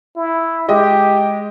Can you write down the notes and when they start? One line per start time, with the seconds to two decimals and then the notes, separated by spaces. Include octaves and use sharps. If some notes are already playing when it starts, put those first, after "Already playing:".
0.16 E4
0.68 G#3 G4 D#5